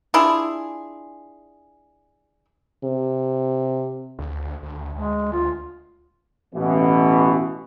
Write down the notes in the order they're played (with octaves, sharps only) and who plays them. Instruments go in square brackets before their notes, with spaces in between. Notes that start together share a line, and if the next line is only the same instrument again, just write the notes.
[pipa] D4 E4 F4 G#4
[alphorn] C3
[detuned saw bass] D2
D2
[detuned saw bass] D2 [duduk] G#3
[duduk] F4
[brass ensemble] A1 B2 E3